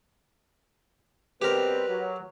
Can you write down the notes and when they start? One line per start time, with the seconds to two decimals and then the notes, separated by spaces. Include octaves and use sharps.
1.42 B2 G3 C4 G4 A#4 B4
1.89 F#3